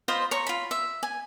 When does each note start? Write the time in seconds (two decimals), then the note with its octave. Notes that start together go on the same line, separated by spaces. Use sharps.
0.08 F4 C5 D#5 B5
0.31 C#5 A#5 C#6
0.47 F4 B5
0.71 E5
1.03 G#5